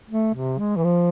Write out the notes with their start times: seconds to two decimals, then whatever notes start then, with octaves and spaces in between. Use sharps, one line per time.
0.09 A3
0.34 C3
0.59 G#3
0.77 E3
0.84 F3